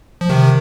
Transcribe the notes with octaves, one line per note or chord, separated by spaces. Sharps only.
F3
C3 D#3